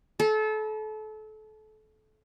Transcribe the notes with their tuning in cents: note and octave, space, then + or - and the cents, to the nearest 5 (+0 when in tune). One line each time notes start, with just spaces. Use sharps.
A4 -30 A#5 +40